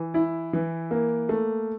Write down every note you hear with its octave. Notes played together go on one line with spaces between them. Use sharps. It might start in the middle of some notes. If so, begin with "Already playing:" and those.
Already playing: E3
E4
E3
A#3
A3